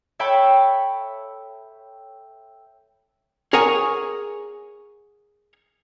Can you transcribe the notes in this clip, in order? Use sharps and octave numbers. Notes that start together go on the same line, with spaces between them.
A4 C#5 E5 G5 A5 B5
G#4 A#4 C#5 F#5 G#5